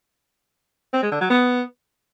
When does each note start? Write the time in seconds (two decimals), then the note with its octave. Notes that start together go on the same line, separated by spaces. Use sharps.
0.93 C4
1.02 G#3
1.12 D3
1.21 F#3
1.30 B3